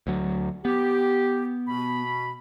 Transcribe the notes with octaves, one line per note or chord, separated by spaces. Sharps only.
D2 F#3
B3 G4
B2 B5